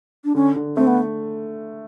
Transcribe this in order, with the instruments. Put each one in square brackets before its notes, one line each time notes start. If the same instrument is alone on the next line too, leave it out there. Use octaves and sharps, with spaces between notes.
[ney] D4
[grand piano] D3 [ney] C#4
[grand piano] D3
[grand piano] A3 [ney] C4
[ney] B3